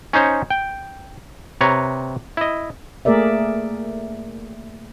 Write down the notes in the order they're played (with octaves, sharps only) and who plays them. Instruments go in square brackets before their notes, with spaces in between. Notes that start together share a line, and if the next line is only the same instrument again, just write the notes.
[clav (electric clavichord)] C#4 D#4 C5 C#5
G5
C3 B4 C#5 A#5
E4 D#5
[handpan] A3 A#3 G#4 A#4 D5 E5